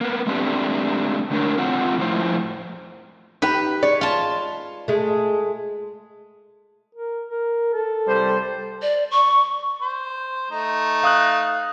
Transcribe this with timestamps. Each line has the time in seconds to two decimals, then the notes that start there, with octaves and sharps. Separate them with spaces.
0.01 A#3 B3
0.27 G#3 A3 C4 D4 G4
1.31 D3 A3 D4 A#4 C#5
1.57 G#3 C4 F4 F#5
1.98 F2 A2 F3 E4 C5
3.42 D#4 G4 B4
3.83 G#3 C#5 D5
4.01 F4 A5
4.88 G#3 A3
6.95 A#4
7.29 A#4
7.73 A4
8.07 C2 G3 C5
8.82 D5
9.11 C#6
9.81 C5
10.51 A3 D#4
11.03 F5 D#6 F#6